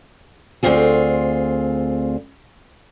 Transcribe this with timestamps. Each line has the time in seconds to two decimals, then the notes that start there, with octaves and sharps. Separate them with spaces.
0.63 D2 G2 C4 F4 G#4